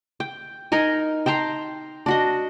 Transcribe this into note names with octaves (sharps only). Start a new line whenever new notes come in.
G5
D#4 A#4 D#5 G#5
G5 A5 A#5 C6
D4 F#4 D#5